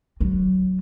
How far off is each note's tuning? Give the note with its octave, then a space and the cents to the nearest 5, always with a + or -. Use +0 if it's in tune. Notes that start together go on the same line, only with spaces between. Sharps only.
F#3 +15